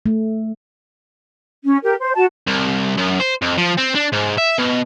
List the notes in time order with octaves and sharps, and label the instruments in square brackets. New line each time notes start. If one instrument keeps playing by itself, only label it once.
[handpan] A3
[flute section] C#4
G4 A#4
C5
F#4 A5
[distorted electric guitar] C2
F#2
C5
F2
F3
C4
D4
G#2
E5
B2